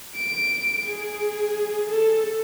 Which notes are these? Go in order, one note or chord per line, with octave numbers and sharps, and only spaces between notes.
D7
G#4
A4